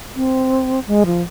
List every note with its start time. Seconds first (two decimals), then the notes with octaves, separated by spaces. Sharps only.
0.16 C4
0.88 G#3
1.06 F3